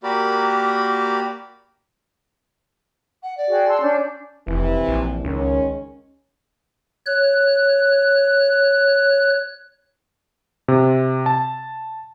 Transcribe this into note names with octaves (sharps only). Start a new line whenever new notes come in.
A#3 F#4 G4 A#4 D5 B5
F#5
D5
F#4 G#4 G5
A5 C6 E6
C#4 D4 G6
F1 C3 E3
A#1
C#2 D#3 G#3 C#4
C#5 F#6
C3
A5